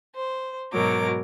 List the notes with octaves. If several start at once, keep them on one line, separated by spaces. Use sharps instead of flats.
C5
G#2 B2 F#3 A#4 D6